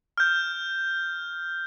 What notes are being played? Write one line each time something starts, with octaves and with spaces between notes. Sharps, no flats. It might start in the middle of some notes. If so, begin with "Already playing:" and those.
F6 G6